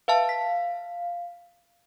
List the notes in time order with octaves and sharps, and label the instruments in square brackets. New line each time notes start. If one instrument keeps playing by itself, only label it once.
[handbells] B4 E5 A5 [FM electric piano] F5
[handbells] B6